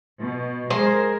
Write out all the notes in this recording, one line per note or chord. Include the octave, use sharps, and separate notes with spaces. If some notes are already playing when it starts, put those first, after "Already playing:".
B2
G#3 G#4 A#4 C5